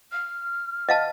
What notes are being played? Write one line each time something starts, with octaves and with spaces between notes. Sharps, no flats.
F6
D#5 F5 A5